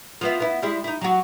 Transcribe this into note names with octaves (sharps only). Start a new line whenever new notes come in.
F3 B3 E4
B3 E4
G3 G#3 E4
D#4 E4
F#3 F#4